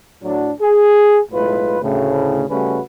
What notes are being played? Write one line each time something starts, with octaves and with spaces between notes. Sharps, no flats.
A2 F#3 D4
G#4
B1 A2 G#3 F4 B4
D2 A2 C#3
C#3 G3 A3 C#4 F#4 B4